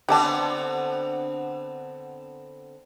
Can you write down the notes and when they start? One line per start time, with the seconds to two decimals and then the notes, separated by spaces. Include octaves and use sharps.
0.09 D3 B3 C4 G4 D5 A5